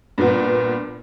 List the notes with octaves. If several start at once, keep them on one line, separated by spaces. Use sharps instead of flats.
G2 A#2 B3